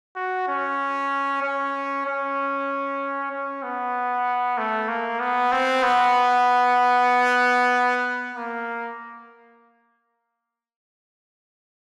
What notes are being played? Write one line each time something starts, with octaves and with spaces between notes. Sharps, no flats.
F#4
C#4
C#4
C#4
C#4
B3
A3
A#3
B3
C4
B3
A#3